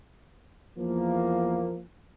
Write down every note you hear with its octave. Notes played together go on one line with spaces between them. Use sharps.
E2 F3 A#3